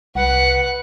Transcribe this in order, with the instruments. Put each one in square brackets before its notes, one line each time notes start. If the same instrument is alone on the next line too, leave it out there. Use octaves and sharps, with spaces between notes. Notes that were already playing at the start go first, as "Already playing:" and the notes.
[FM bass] C2 [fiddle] B4 F#6 [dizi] F#5